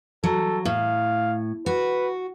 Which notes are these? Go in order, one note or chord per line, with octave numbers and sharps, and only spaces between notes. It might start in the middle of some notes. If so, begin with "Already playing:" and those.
F#3 A4
A2 F5
F#4 B4